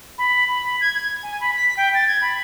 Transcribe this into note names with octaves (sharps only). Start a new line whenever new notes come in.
B5
B5
G#6
G#6
G#5
B5
B6
G5
A6
G#6
B5